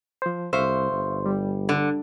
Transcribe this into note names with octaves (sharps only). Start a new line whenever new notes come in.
F3 C5
C2 C5 E5 F5 C#6
G1
G3
D3